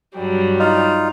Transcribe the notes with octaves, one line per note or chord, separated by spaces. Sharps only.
G2 F#3 G3
D#4 F4